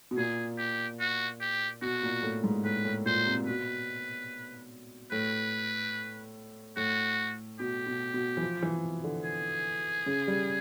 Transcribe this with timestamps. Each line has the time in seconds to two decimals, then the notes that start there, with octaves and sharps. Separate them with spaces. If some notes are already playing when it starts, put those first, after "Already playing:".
0.11 B2
0.17 A#2 G#4
0.58 G4
0.99 F#4
1.41 G4
1.82 B2 F#4
2.03 A#2
2.23 A2
2.44 G#2
2.64 A2 B4
2.85 A2
3.06 A#2 C5
3.26 C3
3.47 B2 B4
5.12 A2 B4
6.77 A2 F#4
7.59 B2 G4
7.87 B2
8.14 B2
8.37 E3
8.41 F3
8.62 E3
9.04 D3
9.24 G#4
10.06 C#3
10.28 G3